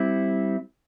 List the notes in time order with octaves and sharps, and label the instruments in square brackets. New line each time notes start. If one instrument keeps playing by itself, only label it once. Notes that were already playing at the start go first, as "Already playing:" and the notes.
Already playing: [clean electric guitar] G3 C4 E4